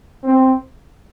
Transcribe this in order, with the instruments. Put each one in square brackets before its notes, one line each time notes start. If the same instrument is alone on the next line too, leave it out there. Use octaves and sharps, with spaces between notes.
[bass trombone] C4